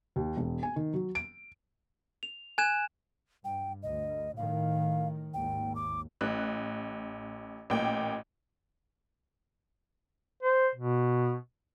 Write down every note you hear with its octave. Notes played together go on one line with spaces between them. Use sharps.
D#2
E1
G#5
D#3
F#3
D7
F7
G#5 F#6 G#6 E7
G2 G5
D2 D#5
A2 D#3 F5
G#1 D#2 G5
D6
A1 F#6
A1 A#2 G5
C5
B2